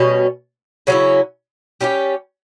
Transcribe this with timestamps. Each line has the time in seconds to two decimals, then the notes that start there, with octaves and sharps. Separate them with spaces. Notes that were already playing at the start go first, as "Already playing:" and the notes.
Already playing: B2 G3 C#4
0.87 C#3 F#3 C#4 E4
1.81 G3 C#4 E4 G4